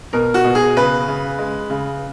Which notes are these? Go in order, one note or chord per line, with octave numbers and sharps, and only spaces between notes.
B2 A#4
F#4
B2
G#4
C#3 B4
C#3
G#3
C#3